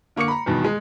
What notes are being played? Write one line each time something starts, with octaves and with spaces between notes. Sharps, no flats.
D3 A#3 C#6 D6 C#7
A#5 B5
E2 G2 B2 D#3
G#3